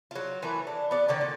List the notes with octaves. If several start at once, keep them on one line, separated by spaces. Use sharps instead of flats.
F#3 F4
E3 A3 A#4 B4
D4
B3 D5
D3 D#3 C#4
A#2